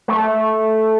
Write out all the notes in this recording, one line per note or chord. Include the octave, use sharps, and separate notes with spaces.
A3